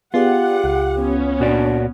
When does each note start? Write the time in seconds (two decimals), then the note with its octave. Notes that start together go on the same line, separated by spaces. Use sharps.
0.14 B3 F4 G4 G#4 D5 F#5
0.64 C#2
0.97 B3 C#4
1.40 A#2 D4 F#4 D5